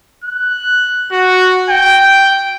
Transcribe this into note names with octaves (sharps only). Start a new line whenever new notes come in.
F#6
F#4
G5